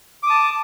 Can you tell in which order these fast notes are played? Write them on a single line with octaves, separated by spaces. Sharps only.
D6 D#6 A5